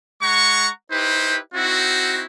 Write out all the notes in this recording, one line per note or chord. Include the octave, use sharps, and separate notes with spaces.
G#3 F#5 A#5 C#6
D#4 E4 G4 B4 C5
C4 D#4 E4 F#4